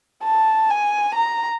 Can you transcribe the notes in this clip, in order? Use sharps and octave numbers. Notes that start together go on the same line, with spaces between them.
A5
G#5
A#5